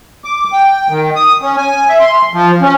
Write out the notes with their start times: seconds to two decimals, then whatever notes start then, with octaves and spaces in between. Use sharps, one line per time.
0.24 D6
0.52 G5
0.89 D#3
1.16 D#6
1.42 C#4
1.57 G#5
1.89 E5
2.00 C6
2.33 F3
2.61 C#4